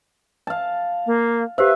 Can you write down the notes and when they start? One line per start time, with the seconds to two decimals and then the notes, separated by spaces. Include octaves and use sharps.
0.47 F5 A5
1.06 A#3
1.58 G4 B4 C5 E5 F5